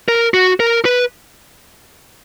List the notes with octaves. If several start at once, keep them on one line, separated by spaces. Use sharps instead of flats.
A#4
F#4
A#4
B4